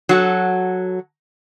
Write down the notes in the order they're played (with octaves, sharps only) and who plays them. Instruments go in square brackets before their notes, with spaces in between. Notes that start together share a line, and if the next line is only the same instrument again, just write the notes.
[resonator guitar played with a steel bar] F#3 F#4 A4